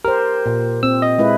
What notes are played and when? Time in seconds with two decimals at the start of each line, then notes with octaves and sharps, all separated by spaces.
0.05 G4 A#4 C5
0.46 A#2
0.83 C4 E6
1.02 D#5
1.19 G#3 E4 B4